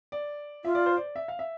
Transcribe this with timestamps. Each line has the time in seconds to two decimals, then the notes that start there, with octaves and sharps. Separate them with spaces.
0.12 D5
0.65 F4 E5
0.75 D5
0.86 C5
0.97 D5
1.16 E5
1.28 F5
1.39 E5